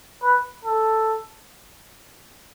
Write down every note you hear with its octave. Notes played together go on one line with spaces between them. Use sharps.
B4
A4